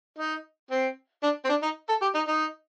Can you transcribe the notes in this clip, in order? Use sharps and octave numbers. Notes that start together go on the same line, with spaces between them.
D#4
C4
D4
C4
D4
D#4
A4
G4
D#4
D#4